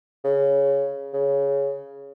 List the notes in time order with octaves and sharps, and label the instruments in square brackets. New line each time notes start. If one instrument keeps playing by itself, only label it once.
[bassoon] C#3
C#3